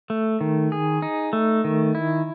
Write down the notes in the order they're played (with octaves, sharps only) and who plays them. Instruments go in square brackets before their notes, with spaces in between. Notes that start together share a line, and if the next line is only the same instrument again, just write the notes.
[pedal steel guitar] A3
D#3
G#4
D#4
A3
D#3
E4